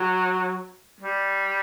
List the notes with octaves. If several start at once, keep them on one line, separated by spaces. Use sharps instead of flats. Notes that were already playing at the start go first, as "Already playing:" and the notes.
Already playing: F#3
G3